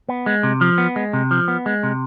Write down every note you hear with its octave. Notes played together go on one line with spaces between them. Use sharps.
B3
G#3
C3
F3
B3
G#3
C3
F3
B3
G#3
C3